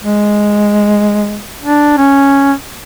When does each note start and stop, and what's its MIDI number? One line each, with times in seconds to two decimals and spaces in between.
0.01 1.41 56
1.62 1.93 62
1.97 2.53 61